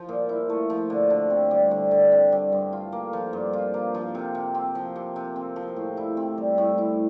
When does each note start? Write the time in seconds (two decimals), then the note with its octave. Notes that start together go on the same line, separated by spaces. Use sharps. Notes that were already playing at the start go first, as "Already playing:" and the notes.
Already playing: F3
0.09 A#2
0.29 E4
0.50 A3
0.70 F3
0.90 D3
1.10 D3
1.30 C4
1.51 G3
1.71 D3
1.91 D3
2.12 C4
2.32 G3
2.52 G2
2.73 F4
2.92 A#3
3.13 F3
3.33 G2
3.53 F4
3.74 A#3
3.95 F3
4.15 C3
4.35 C3
4.55 C4
4.75 F3
4.96 C3
5.16 C3
5.36 C4
5.56 F3
5.76 A2
5.97 E4
6.17 C4
6.38 G3
6.58 A2
6.78 E4